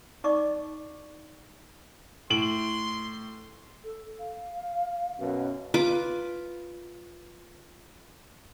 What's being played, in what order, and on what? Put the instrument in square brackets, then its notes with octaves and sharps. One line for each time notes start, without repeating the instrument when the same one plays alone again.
[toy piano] D#4 D5 D#5 C#6 D6
[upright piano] A2 D7 F#7 [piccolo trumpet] C6
[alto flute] A4
F5
[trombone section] F#2 B2
[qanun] F4 B4 D6